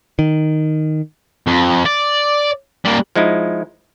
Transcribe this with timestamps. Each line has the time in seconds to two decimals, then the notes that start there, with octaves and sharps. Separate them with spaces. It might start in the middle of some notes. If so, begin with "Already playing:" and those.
0.19 D#3
1.47 F2
1.86 D5
2.85 G3 A#3
3.16 F3 G#3 D#4 E4